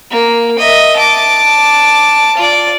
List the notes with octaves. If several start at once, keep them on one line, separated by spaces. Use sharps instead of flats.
A#3
D#5 E5
A5 D6
F4 D5